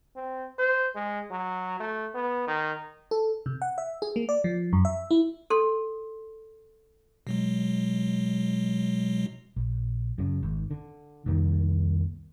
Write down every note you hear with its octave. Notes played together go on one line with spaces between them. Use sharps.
C4
C5
G#3
F#3
A3
B3
D#3
A4
C3
F#5
E5
G#4
A#3
D5
F3
F#2
E5
E4
A4 C6
B2 F#3 G#3
A#1
F#2 C#3
G#1
D3
C2 F2 D#3 A#3